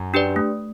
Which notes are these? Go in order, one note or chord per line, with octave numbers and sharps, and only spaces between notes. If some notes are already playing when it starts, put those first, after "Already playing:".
Already playing: F#2
D4 G4 B4 D5
A3